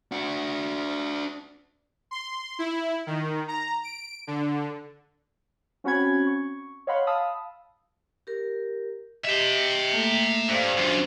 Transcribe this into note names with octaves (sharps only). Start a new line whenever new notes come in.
D4 F#4
C6
E4
D#3
A#5
D7
D3
C4 C#4 F#4 F#5 B5 G#6
C#6
C#5 D#5 F5 F#5 B5 C6
F5 A5 B5 D#6 E6
G4 A#4
G4 D#5 E5 G5
A3 A#3 A4
G2 C5 D5 F5
F#2 D4 F4 F#4 C5